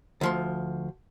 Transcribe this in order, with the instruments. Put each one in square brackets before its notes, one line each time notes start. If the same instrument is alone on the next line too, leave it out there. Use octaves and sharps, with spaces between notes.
[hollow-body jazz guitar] D2 F3 C6